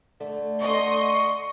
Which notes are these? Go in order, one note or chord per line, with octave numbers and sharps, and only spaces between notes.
D3 A3
A3 D#5 C6 C#6